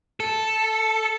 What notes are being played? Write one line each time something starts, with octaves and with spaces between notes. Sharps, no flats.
A4